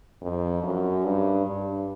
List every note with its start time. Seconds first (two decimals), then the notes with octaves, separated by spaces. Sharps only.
0.22 F2
0.63 F#2
1.05 G2
1.46 G2